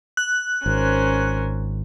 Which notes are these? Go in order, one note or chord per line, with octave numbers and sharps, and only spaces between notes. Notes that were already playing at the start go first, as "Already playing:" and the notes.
F#6
G#1 C#4 A#4 C5